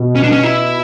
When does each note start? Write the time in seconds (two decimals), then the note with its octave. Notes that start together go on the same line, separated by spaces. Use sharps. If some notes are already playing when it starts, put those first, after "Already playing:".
Already playing: B2
0.15 C#4
0.23 D4
0.32 C#4
0.43 E4